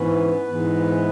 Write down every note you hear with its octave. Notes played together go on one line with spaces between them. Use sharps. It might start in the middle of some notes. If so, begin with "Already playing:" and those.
Already playing: G#2 E3 B3 C#4 B4
G#2 E3 G#3 B3